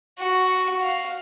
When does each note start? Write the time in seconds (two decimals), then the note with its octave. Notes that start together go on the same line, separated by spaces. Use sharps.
0.19 F#4
0.82 F5